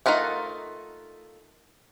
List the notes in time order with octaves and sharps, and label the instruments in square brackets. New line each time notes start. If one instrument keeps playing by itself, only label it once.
[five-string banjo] A3 D#4 F4 A#4 F#5